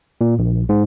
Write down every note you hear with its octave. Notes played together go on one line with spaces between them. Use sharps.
A#2
A#1
G#2